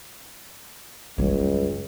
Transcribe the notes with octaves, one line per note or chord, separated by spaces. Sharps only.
C#2 F#2 G3